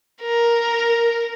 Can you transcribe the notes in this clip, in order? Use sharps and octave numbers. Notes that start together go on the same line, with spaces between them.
A#4